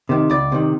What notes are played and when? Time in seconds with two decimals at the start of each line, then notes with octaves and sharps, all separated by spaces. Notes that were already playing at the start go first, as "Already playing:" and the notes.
0.09 C3 D#3
0.30 C#2 D5
0.52 C3 D#3